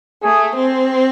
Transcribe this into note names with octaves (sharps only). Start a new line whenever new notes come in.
A3 G#4
C4